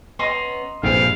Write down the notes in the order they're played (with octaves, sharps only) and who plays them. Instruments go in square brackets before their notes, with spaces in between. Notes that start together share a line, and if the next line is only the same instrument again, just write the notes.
[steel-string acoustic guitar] B3 C#4 [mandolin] D#5 A#5 C6
[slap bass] A#1 G2 C3 [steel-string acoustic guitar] A4 B4 C5 [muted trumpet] F5